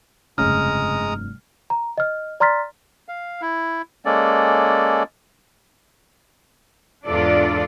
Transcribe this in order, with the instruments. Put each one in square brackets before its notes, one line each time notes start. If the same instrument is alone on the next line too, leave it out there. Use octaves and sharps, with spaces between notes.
[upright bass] F1 G2 [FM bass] C#3 [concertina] G#3 A#5 D#6 [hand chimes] F6
[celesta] A#5
D#5 F6
D5 A#5 C6 F6 A6 B6
[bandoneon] F5
E4
G#3 A#3 C#4 A4 D5
[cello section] E2 G#2 D4 F4 A4 D5